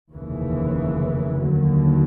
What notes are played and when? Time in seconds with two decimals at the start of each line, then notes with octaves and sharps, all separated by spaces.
0.13 F1 D#2 C#3 E3
1.40 D#2 D3 F#3